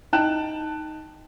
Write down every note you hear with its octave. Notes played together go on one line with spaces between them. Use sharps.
D#4 G5 A5 F#6 E7